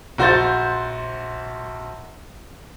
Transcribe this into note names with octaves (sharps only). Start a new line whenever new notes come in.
A#1 F#4 C5 G6 A6